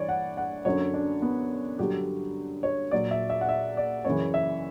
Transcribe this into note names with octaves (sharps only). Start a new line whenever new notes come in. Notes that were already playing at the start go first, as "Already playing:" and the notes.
Already playing: G2 E3 C#5 D5
F#5
F#5
F#2 D3 F#3 C#5
D4
B3
G2 D3 F#3 G4
C#5
A#2 F#3 D5
E5
E5
F#5
E5
D5
F#2 C#3 E3 C#5
E5